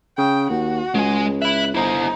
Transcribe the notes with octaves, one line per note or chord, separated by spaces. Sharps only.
C#3 G5
D#2 F#4
C#2 G#3 G#5
E4 E5 F#6
G1 D#4 E4 C5